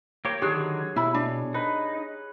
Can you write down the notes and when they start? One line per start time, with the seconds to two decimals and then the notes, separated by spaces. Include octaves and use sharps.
0.25 A#3 G4 C#5
0.42 D3 D#3 F#3 G4 G#4 F#6
0.96 B2 E4 B5
1.14 D4
1.54 D#4 B4